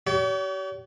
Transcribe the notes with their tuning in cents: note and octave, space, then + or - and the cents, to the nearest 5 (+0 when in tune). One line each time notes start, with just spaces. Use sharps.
G4 -40 C#5 +45